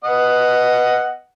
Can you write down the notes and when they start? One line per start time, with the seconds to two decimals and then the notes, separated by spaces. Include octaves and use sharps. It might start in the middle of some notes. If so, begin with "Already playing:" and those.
0.04 B3 D#5 F#5